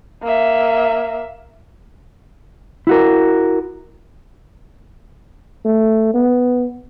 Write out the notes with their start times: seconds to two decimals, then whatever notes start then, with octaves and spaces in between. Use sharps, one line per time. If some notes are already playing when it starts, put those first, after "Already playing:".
0.23 A#3 E5
2.87 E4 F#4 A#4
5.65 A3
6.14 B3